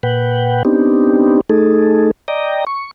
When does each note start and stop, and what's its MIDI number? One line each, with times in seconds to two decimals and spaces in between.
0.03 0.63 46
0.03 0.63 71
0.03 0.63 78
0.03 0.63 79
0.65 1.41 59
0.65 1.41 60
0.65 1.41 62
0.65 1.41 63
0.65 1.41 67
1.50 2.11 57
1.50 2.11 63
1.50 2.11 68
1.50 2.11 69
2.28 2.65 74
2.28 2.65 75
2.28 2.65 79
2.28 2.65 82
2.67 2.91 85